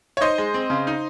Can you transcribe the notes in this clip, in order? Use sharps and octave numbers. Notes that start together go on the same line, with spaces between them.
C#5
D#4 C5 D#5
G#3
C4
C#3
D#4